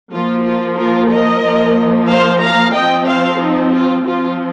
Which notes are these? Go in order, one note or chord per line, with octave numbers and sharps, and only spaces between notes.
F3 A#3 F4
F4
F4 A#4
A#4 D#5
F3 A#3
C5 F5
F5 A#5
F3 C4 D#5 G5
C5 F5
D#4
F4
F3 C4 F4